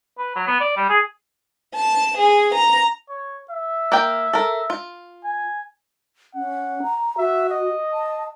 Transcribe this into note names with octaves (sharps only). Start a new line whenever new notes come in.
B4
F#3
B3
D5
G3
G#4
A5
G#4
A#5
C#5
E5
A#3 A#4 G5
A4 A#4
F4
G#5
C#4 F#5
A#5
F#4 E5
D#5
A5